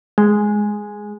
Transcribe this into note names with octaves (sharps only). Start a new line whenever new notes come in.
G#3